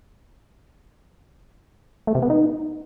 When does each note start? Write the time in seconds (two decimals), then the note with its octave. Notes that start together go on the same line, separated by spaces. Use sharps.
2.07 A3
2.15 C3
2.22 B3
2.30 D#4